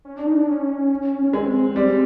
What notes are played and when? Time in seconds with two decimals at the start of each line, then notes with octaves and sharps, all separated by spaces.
0.05 C#4
0.16 D4
0.26 D#4
0.37 D4
0.48 C#4
1.23 C#4
1.33 G#3 C4
1.76 G3